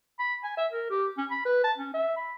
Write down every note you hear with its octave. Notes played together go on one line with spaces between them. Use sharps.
B5
G#5
E5
A#4
G4
C#4
B5
B4
A5
C#4
E5
B5